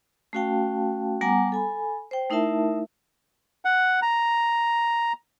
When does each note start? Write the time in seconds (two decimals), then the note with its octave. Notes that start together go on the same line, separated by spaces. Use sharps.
0.33 A3 C#4 F#4 F5 G5 A5
1.21 G3 B3 F#5 G#5 A#5 D6
1.52 A4 G#5 B5
2.11 C5 G5
2.30 A3 D#4 E4 A#4 E5 A5
3.65 F#5
4.02 A#5